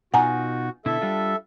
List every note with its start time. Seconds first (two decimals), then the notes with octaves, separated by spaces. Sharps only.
0.14 B2 D#4 F4 F#4 F#5 G#5 A#5
0.86 B2 D3 E4 A4 E5
1.02 G3 D4 F4